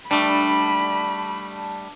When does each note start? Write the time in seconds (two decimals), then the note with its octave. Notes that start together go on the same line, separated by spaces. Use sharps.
0.11 G3 A3 D4 B5